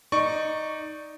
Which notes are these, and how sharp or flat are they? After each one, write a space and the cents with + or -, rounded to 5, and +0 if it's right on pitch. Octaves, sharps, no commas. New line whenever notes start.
D#4 +0 D5 +10 C#6 +0